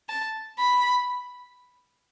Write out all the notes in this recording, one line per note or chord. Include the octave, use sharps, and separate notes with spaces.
A5
B5